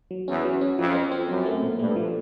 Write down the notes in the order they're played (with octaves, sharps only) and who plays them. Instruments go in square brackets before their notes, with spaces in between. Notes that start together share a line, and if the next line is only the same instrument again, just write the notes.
[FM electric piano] F#3
[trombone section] E2 [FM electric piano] C#4
[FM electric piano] F#3
C#4
[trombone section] F2 [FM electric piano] F3
[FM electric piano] C4
C4
[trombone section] F#2 [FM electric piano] C4
[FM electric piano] A3
A#2
[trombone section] G2 [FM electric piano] A3
[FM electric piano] F3